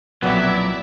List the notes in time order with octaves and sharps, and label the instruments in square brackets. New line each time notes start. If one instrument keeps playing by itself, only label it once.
[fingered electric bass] B1 A#2 [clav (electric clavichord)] F2 B3 [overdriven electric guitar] F#3 [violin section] E4 D5 E5